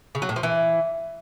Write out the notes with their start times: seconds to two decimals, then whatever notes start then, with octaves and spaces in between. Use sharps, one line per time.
0.15 C#3
0.22 F#3
0.29 A2
0.36 F3
0.43 E3